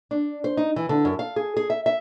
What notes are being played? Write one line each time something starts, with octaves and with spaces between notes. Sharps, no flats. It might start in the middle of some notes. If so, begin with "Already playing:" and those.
D4
C5
D#4
E3
D3
F#2
F5
G#4
G#4
E5
E5